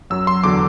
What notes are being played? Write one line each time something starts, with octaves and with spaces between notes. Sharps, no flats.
F#2 F#3 E6
C6
E2 D3 F#3 D6